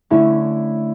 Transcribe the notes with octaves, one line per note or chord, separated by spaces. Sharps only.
D3 A3 C#4 E4